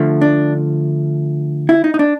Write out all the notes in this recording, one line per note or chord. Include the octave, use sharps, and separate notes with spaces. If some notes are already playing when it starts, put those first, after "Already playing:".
Already playing: D3 F3 A3
D4
E4
D#4
D#4
D4